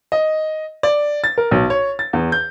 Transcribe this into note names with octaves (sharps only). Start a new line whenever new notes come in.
D#5
D5
A6
A#4
B1
C#5
A6
E2
G6